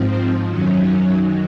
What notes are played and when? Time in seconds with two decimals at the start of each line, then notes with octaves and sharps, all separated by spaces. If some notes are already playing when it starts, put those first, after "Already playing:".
Already playing: G#2 F3 C4
0.48 F#2 D#3 F#3 C#4